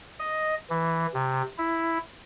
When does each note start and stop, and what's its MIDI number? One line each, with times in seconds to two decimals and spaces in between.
0.19 0.55 75
0.70 1.07 52
1.14 1.42 48
1.58 1.98 64